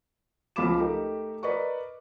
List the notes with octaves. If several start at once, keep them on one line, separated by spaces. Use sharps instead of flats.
C#2 F3 F5 B5 D6 E7
A3 D#4 G4 A#4
A#4 B4 D5 D#5 C#6